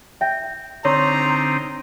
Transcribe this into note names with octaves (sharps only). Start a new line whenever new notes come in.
E5 G5
D3 C4 D#4 C#5 A#5 C6 C#6